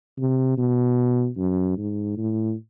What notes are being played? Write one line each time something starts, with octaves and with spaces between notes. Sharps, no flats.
C3
B2
F#2
G#2
A2